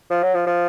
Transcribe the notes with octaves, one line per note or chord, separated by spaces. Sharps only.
F3
F#3
F3
F3